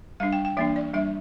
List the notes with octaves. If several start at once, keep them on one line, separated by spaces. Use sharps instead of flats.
G3 D4 F5
G5
G5
E3 A#3 D4 E5
D5
G3 D4 E5